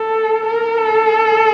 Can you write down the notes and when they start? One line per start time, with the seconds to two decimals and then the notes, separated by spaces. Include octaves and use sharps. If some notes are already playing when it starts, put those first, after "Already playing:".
Already playing: A4
0.46 A#4
0.78 A4